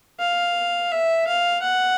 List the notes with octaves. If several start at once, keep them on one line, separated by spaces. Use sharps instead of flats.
F5
E5
F5
F#5